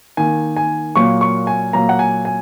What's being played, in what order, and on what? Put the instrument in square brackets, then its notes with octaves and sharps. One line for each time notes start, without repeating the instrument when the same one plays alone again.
[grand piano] D#3 A#3 G#5
G#5
A#2 F#3 A#3 C#6
C#6
G#5
A#2 F#3 A#3 A#5
F#5
G#5
G#5